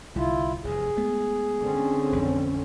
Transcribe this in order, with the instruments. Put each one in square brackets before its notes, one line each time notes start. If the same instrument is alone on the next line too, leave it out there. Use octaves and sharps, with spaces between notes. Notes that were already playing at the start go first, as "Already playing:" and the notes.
[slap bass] C2 D3 G3 [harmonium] E4 F4
[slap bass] F1 E2 G2 [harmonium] G#4
[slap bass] G#3 A3 B3
[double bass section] D3 C4 C#4
[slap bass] A1 F2